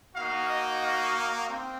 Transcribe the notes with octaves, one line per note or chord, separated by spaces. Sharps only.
A#3 D#4 F#4 F5
D#5
F5
C4